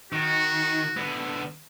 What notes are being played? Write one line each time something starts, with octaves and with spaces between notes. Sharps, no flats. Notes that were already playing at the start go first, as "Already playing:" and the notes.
D#3 F#4
D3 B3